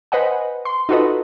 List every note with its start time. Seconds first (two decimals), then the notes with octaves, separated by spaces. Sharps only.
0.12 B4 C5 D#5 F#5 G#5
0.65 C6
0.89 D#4 F4 F#4 A4 B4 D#5